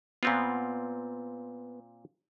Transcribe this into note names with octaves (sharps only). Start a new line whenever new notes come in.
A#2 B3 C4 F4